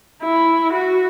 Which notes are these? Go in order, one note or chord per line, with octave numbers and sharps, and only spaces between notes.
E4
F#4